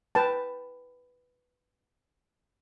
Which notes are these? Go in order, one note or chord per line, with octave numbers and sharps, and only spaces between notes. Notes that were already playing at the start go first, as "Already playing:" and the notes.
B4 G5 A5